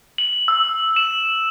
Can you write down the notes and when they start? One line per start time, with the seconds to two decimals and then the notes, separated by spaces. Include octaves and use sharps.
0.18 F#7
0.48 E6
0.96 E7